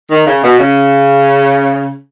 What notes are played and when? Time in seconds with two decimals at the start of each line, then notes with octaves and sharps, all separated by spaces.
0.11 D#3
0.26 C#3
0.43 B2
0.59 C#3